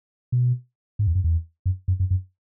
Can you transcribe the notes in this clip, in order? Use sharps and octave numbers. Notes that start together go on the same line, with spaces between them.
B2
G#2
E2
F#2
E2
F#2
F#2
F#2
F#2